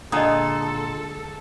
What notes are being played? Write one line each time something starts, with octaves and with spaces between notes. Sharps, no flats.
A#2 D3 G#3 A4 D#5 D#6